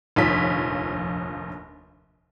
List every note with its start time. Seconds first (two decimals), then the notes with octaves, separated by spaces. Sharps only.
0.16 F1 A#1 D#2 F3 C#5 B6